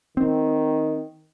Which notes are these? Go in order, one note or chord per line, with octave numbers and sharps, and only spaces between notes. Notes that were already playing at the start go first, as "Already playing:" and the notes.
D#3 C4